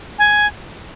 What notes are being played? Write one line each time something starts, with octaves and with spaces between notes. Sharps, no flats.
G#5